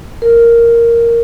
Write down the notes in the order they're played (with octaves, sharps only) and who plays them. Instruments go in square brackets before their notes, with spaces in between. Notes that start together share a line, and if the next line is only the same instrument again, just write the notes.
[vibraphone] A#4